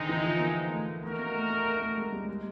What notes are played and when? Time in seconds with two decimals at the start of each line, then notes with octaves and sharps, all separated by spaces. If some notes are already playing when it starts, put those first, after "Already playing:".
Already playing: D3 D#3 G#3 C4 D#4
0.09 E3
0.24 F3
0.40 A#3
0.72 A3
1.03 A3 D#4 F#4 A#4
1.19 A#3
1.34 A3
1.50 A3
1.66 A3
1.82 A3
1.98 G#3
2.12 G3
2.29 G#3